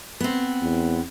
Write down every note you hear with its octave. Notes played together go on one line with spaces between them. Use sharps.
B3 C4
E2